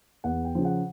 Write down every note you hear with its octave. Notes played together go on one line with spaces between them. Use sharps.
E2 F#5
G5
C#3 F3
F#5